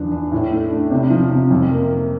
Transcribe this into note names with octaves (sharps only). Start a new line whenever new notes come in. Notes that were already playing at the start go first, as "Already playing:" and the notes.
Already playing: E2 F3 D4
D4
A2
A3
D4
C3
F3
C3
F2
A#3
A#3